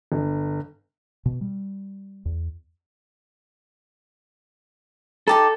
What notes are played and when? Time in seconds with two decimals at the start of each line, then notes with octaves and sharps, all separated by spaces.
0.12 G1
1.26 B2
1.41 G3
2.25 E2
5.28 D#4 G4 A4 A5